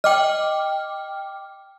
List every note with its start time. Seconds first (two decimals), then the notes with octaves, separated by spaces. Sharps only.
0.04 D#5 G5 D6 F6